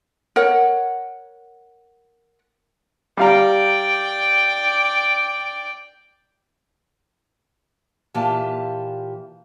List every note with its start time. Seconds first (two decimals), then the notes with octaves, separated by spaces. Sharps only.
0.36 A#4 C#5 F#5
3.17 G3 D5 F5 G5 A#5
8.14 A#2 E3 F4 G4 A5